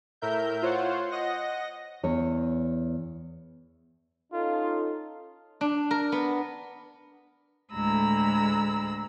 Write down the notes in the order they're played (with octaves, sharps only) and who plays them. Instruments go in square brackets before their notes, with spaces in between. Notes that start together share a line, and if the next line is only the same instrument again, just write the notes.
[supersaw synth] A2 A#4 E5 G6
F4 C5 C#5 F#5
D#5 F#5 A#6
[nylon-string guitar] E2 C#5
[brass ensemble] C#4 D#4 A4 [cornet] F4
[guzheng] D4
A#4
B3
[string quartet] D2 A2 G#3 A#5 B5 E6